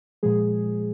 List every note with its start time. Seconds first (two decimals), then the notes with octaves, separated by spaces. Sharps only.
0.23 A#2 F3 G#3 G#4